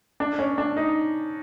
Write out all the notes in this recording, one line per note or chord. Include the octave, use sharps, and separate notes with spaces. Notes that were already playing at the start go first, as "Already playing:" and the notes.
D4
C#4
D4
D#4